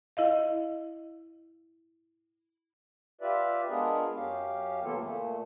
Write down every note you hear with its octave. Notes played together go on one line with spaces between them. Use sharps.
E4 D#5 F5
F4 G4 B4 D5 E5
G#3 B3 D4 F4 G#4 A#4
F#2 C#4 G4 F5
C#3 E3 A#3 B3 F4 A4
A#2 A3